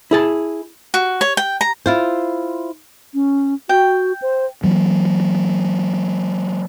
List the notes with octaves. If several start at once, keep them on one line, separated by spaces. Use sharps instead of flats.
E4 G#4 A5
F#4
C#5
G5
A#5
E4 F4 C5
C#4
F#4 G5
C5
E3 F#3 A#3